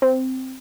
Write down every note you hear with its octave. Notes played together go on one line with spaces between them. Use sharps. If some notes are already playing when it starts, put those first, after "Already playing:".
C4